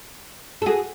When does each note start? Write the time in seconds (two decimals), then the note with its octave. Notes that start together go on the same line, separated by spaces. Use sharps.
0.62 A4
0.66 F#4 G#4